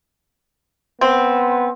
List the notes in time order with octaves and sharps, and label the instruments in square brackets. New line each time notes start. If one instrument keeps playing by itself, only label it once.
[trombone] B3 [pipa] C4